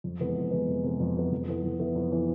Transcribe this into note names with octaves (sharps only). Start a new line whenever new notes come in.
F2
C3 E3 G#3 B3
F2
C3 E3 G#3 B3
F2
C3 E3 G#3 B3
F2
C3 E3 G#3 B3
F2
E3 B3 E4
F2
E3 B3 E4
F2
E3 B3 E4